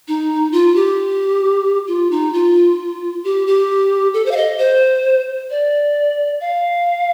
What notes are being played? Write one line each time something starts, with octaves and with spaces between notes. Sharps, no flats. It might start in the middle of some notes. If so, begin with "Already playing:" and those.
D#4
F4
G4
F4
D#4
F4
G4
G4
A4
C5
F5
D#5
C5
D5
F5